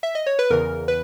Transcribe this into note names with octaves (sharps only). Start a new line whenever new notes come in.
E5
D#5
C#5
B4
E2 C#3 E3 A#4
B4